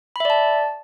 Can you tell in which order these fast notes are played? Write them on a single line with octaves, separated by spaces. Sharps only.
B5 E5 D5 A5